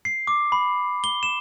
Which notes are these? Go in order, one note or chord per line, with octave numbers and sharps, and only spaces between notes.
C7
D6
B5
G7
E7